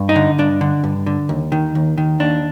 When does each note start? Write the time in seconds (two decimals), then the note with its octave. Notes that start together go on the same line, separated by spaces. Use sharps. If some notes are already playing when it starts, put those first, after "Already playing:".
Already playing: G2
0.09 D#4
0.16 D3
0.38 G2 D4
0.61 D3
0.84 G2
1.06 D3
1.29 D#2
1.52 D#3
1.75 D#2
1.98 D#3
2.20 D#2 D4